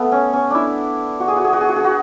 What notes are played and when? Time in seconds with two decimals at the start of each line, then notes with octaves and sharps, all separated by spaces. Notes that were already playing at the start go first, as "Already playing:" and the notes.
Already playing: A3 B3
0.12 C#4
0.33 C#4
0.51 D4 E4
1.20 F#4
1.28 G#4
1.36 F#4
1.44 G#4
1.53 F#4
1.61 G#4
1.69 F#4
1.76 G#4
1.84 F#4